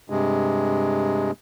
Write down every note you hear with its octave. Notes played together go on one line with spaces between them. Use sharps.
G2 C3 G#3